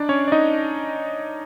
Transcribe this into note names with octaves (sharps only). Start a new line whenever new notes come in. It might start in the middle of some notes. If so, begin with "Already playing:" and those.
Already playing: D4 D#4 D5
C#4 C#5
D5
D#4 D#5